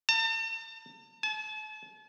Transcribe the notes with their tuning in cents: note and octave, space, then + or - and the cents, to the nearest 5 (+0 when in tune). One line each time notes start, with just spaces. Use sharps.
A5 +40
A5 -40